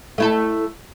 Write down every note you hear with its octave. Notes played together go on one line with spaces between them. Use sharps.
A3 E4 A4